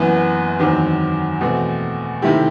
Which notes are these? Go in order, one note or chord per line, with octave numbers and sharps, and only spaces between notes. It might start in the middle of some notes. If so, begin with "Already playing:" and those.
Already playing: F#1 F#2 E3 B3
F#1 E2 D#3 F#3 C4
E2 B2 A3 C4 F#4
C3 D#3 A3 E4 G4